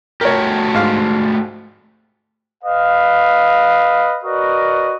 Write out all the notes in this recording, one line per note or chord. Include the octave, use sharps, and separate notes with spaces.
A3 F#4 G4 A#4 C#5
G#2 F5
B4 D#5 F5
F#4 A#4 B4 D5 D#5